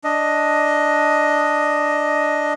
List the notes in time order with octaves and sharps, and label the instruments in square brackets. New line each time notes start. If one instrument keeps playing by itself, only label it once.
[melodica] D4 D#5